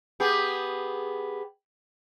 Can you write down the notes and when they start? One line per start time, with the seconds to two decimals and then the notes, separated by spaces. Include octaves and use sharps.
0.20 B3 G4 G#4